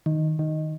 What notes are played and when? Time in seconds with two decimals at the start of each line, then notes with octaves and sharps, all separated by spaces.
0.06 D#3
0.39 D#3